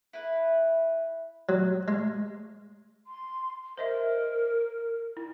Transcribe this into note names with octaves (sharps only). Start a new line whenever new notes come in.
E4 B4
F#3
G#3
C6
A#4 C5 D#5 E5
E4